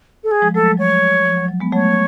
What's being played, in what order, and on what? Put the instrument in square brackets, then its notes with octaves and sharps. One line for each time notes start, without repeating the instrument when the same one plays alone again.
[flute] A4
G#4
[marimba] F3 G#3
[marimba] F#3 A3 [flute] A4
[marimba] F3 G#3
[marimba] F#3 [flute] C#5
[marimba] F3
F#3
F#3
G#3 B3
[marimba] F#3 A3 [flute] C#5